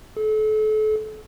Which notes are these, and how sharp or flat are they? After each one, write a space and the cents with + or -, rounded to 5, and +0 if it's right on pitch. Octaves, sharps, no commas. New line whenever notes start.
A4 -35